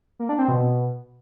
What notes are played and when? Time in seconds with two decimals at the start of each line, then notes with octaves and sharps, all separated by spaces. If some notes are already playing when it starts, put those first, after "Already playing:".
0.19 A#3
0.29 D4
0.39 C4
0.48 B2